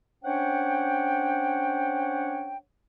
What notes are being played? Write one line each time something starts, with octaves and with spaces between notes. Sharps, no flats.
C#4 D4 C5 C#5 F#5 G5